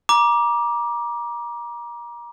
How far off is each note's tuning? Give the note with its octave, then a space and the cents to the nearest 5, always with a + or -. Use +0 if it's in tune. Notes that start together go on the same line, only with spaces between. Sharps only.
A#5 +30 D6 +0